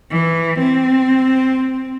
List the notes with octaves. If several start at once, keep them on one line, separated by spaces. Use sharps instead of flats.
E3
C4